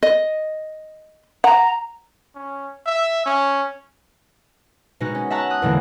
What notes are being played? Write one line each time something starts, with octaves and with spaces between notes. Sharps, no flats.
D#5
F#5 A#5
C#4
E5
C#4
B2 G#3 D#4 F#4
C#4
E5 F#5 A5 A#5 C#6 F#6
D#6 F#6
E2 B2 D3 E3 G#3 A#3